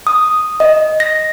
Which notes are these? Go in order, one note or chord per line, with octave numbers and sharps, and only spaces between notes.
D#6
D#5
A#6